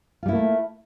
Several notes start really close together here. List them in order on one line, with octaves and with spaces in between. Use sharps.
F4 G3 E4 A#3 A3